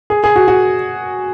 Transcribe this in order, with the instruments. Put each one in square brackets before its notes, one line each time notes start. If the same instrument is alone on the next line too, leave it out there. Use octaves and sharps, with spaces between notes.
[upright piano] G#4
G#4
F#4
F#4